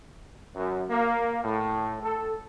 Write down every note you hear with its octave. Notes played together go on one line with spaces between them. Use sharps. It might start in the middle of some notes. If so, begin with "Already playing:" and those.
F#2
A#3
A2
A4